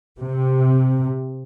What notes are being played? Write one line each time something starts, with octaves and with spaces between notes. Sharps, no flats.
C3